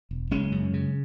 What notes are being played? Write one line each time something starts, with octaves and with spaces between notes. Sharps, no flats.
E1
F#1 G#3 C#4
F#2
C#3